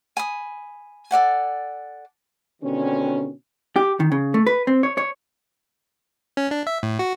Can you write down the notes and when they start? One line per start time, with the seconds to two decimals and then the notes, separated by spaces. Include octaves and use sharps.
0.17 G#5 B5 D#6
1.11 A4 D5 F#5 G#5
2.62 B2 D3 D#3 G3 C4 C#4
3.76 G4
4.00 D#3
4.12 C#3
4.34 A3
4.47 B4
4.67 C4
4.83 C#5
4.97 C#5
6.37 C#4
6.51 D4
6.67 E5
6.83 A2
6.99 F#4